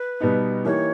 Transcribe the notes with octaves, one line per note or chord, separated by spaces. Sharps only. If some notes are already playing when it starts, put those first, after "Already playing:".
Already playing: B4
B2 G3 B3 D#4
E3 A#3 D#4 G4 C#5